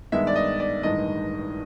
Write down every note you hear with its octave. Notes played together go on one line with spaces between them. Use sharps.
G2 D#3 G#3 B3 E5
D5
D#5
D5
A1 G2 D#3 G#3 D#5